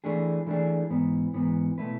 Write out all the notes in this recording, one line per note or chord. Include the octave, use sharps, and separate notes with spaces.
E3 A3 D4 G#4
E3 A3 D4 G#4
G#2 E3 B3
G#2 E3 B3
B2 A3 E4 B4